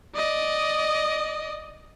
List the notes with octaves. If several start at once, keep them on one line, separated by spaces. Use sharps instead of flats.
D5 D#5